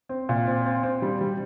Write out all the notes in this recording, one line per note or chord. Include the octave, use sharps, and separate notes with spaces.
C4
A#2
C4
C4
C4
G3
G3